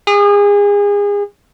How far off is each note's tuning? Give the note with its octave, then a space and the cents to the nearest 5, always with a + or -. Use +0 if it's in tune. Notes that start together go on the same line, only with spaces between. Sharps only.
G#4 -30